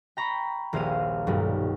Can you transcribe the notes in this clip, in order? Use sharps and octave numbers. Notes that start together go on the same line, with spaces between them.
G5 A#5 B5 C#6
D#1 A#1 C5 C#5 F5 D#7
B1 G2 D#3 G3